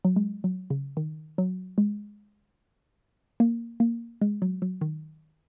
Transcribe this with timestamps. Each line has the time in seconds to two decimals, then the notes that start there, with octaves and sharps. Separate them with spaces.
0.05 F#3
0.16 G#3
0.44 F#3
0.70 C#3
0.97 D#3
1.38 F#3
1.78 G#3
3.40 A#3
3.80 A#3
4.21 G#3
4.42 F#3
4.62 F#3
4.81 D#3